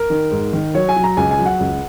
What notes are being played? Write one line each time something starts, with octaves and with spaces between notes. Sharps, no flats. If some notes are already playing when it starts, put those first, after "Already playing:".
Already playing: A#4
D#3
G#2
D#3
F#3 C#5
G#5
F#3
A#5
C#2 G#5
G#5
F#3
F#5
C#2